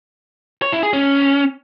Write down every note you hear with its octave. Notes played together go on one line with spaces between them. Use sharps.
C#5
E4
G#4
C#4